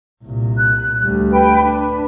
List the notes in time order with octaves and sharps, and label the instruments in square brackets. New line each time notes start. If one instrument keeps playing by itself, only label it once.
[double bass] C2 A#2
[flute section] F#6
[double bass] D2 G3
[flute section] B4 G5
[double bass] D4 [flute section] B4